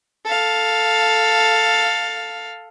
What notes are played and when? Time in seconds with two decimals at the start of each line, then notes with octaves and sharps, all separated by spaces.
0.25 A4 F5